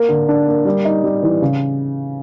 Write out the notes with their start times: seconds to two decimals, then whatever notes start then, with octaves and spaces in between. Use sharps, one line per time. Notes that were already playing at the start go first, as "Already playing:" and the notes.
Already playing: A#3
0.09 D3
0.28 D4
0.47 A#3
0.65 G3
0.85 D#4
1.04 G3
1.23 E3
1.42 C#3